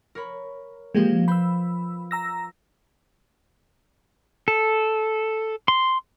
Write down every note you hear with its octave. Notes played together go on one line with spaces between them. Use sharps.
A#4 C#5 B5
F3 G#3 A#3 C4 G4
B4 C5 B5 E6
A#5 E6 A#6
A4
C6